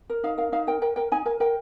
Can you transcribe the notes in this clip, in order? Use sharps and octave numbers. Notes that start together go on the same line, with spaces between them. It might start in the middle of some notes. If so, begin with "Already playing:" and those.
A#4
D#4 F5
A#4 F5
D#4 F5
A#4 G5
A#4 G5
A#4 G5
D#4 G#5
A#4 G#5
A#4 G5